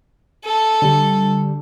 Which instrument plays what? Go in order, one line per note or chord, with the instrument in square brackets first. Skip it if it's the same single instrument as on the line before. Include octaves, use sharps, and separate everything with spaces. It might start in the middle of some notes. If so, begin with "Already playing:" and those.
[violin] A4
[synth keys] D3 G3